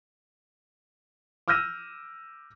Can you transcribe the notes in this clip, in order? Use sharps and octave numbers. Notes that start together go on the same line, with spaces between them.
D6 E6 F6 G6 A#6 D#7